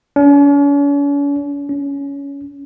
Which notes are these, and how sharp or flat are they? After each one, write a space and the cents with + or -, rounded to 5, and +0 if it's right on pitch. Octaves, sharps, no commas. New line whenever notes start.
C#4 +45
C#4 +20